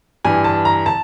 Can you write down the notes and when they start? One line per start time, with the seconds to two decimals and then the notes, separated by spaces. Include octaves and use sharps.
0.25 G2 E3 G#5
0.44 A5
0.65 A#5
0.86 A5